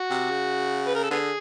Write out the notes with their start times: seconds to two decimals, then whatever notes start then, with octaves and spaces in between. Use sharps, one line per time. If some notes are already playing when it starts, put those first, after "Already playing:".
Already playing: F#4
0.10 C3
0.31 C#3
0.87 B4
0.95 A#4
1.03 A4
1.11 D3 B3 G#4